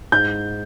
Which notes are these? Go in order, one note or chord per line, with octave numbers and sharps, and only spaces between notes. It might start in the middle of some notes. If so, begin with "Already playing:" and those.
G#2 G6